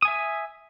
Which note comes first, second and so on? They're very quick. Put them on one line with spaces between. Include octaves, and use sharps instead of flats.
D#6 G#5 E5